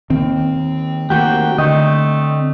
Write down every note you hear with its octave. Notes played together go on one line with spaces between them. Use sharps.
D#3 A#3 C4
D#3 A3 A#3 F#4 G4 G5
D3 A3 D#5